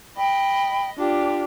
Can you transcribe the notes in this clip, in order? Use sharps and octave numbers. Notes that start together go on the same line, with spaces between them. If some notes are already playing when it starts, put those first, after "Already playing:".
D#5 G5 B5
D4 F4 G4